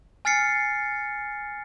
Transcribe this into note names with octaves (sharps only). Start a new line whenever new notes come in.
G#5 F6 A6 C7 C#7